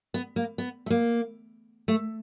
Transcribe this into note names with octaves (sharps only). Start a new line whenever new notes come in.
B3
A#3
B3
A3
A#3
A3